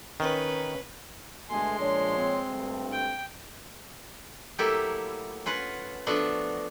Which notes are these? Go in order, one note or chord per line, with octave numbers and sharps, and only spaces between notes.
D#3 C#4 B4
B2 D3 G#3 A3 G#5 C6
A#2 F3 D4 C#5
C4
D2 G2
G5
F#3 A3 A#3 E4 G4 A4
C#4 F4 B4 F#5
F3 A3 B3 D4 F#4